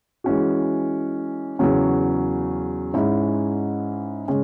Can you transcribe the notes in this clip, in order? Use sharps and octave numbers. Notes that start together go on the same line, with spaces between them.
E3 G#3 C#4 F#4
E2 C#3 F#3 C#4
G#2 G#3 C#4 E4
C#3 G#3 C#4